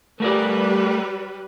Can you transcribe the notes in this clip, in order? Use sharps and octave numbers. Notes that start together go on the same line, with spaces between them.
G3 A3 A#4 B4 D5